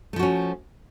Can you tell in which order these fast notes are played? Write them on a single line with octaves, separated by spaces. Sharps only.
A3 F3 F#4 C#4